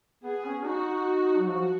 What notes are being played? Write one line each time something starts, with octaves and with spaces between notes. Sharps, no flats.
B3 G#4
C#4
D#4 F#4
F#3
F3 F#4